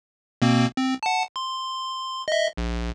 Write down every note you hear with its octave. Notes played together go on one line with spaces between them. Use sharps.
B2 A#3 C4
C4
F#5 A5
C6
D#5 E5
A#1